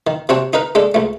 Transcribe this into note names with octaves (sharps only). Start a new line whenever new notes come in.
D#3
C3 C4 F#4 C#5 A5
D#4 A#4 B4 A#5
G#3 D4 A4 A5
C#2 A3